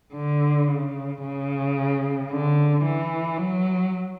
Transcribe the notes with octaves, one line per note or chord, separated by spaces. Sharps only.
D3
C#3
C#3
D3
E3
F#3